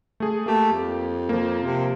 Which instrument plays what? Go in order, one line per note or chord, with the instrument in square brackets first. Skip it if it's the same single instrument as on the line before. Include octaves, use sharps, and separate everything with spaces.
[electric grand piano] A3 G#4
[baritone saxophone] A3 [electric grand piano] A#3 G4
[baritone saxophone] F2
[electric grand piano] F3 A#3
[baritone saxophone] C3